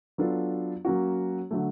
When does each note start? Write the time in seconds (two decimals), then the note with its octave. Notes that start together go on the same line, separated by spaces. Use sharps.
0.18 F#3 B3 D4 F4 A4
0.85 F#3 A#3 C#4 F#4
1.51 D3 F#3 A3